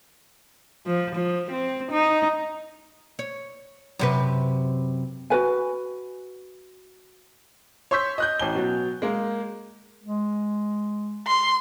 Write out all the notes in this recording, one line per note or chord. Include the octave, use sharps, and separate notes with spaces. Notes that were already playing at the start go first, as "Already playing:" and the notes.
F3
F3
C4
D#4
C#5
F#2 C3 B4
F#4 A#4 B4 G#5
C#5 C6 C#6 E6 G6 B6
D#5 F#6 G6
A1 G#5 G7
B2 F#3
G#3 A#3
G#3
C6